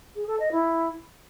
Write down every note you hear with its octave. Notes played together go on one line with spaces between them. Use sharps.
G#4
A4
D#5
E4